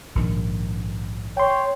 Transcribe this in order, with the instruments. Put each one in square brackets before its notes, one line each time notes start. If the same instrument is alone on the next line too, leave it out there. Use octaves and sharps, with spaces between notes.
[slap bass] A#1 D#3 [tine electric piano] G#2
[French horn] C#5 [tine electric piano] G5 C6